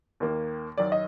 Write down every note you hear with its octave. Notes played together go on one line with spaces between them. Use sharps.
D#2 D#3 A#3
F#2 D#3 F#3 D5
D#5